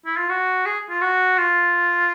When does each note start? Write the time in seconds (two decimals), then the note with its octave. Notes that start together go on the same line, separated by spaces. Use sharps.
0.06 E4
0.17 F4
0.29 F#4
0.66 G#4
0.90 F4
1.01 F#4
1.38 F4